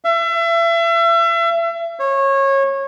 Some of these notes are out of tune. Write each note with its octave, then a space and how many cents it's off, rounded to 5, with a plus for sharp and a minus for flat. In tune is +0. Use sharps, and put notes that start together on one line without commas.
E5 +35
C#5 -25